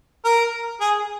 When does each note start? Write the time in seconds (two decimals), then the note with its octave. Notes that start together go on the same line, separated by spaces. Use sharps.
0.25 A#4
0.81 G#4